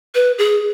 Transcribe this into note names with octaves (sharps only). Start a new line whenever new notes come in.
B4
G#4